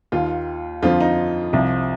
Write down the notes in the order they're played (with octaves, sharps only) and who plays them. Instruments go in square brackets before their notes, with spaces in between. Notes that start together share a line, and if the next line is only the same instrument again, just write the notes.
[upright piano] D#2 D#3 F4
F2 D3 F3 F4
D#4
C2 C3 F3